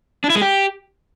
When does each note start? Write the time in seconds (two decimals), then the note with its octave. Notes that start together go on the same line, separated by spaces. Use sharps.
0.24 D4
0.30 E4
0.36 G#3
0.41 G4